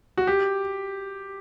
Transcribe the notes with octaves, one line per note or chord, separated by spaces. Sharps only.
F#4
G4